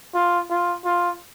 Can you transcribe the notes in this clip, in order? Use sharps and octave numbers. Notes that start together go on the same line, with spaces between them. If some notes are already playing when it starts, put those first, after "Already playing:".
F4
F4
F4